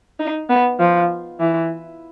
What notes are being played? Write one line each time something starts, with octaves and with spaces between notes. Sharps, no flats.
D#4
B3
F3
E3